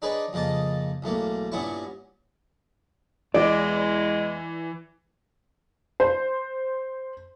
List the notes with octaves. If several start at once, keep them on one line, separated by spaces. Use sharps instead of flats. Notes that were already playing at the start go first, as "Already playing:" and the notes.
D4 D#4 G#4 B4 C#5
F2 C#3 A#3 D#5 A5
B1 E2 A3 A#3
G2 A#2 B3 C#4 E4 C#6
E2 E3 G#3 D5
C5